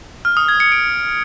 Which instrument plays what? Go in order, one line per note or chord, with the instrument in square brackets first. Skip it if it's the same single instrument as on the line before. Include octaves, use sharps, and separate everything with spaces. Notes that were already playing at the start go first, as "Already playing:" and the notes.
[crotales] F6
D#6
G#6
C#7
D7